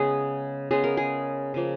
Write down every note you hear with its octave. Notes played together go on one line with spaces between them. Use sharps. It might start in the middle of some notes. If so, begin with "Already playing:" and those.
Already playing: C#3 G#3 B3 G#4
C#3 G#3 B3 G#4
A#4
G#4
C#3 F3 A#3